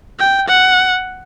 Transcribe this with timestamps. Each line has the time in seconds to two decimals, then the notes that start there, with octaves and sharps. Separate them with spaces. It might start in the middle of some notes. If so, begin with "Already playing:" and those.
0.19 G5
0.48 F#5